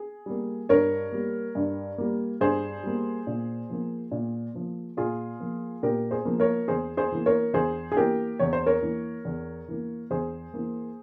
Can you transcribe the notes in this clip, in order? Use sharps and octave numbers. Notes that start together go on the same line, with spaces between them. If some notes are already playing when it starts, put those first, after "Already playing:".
Already playing: G#4
G3 A#3
G2 A#4 C#5
G3 A#3
G2
G3 A#3
G2 G#4 C5
G3 A#3
A#2
F3 A#3
A#2
F3 A#3
A#2 F4 G#4
F3 A#3
A#2 G4 A#4
G#4 C5
F3 A#3
A#4 C#5
E2 G#4 C5
G#4 C5
E3 A#3
A#4 C#5
E2 G#4 C5
G#4
E3 A#3 G4 A#4
E2 C#5
C5
A#4 C#5
E3 A#3
E2
E3 A#3
E2 G#4 C5
E3 A#3